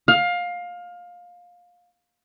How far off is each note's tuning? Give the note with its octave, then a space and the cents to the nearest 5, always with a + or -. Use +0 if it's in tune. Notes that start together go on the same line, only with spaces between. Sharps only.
F5 +20